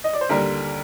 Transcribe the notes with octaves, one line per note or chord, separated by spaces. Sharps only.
D#5
D5
C5
D#2 D3 G3 A#4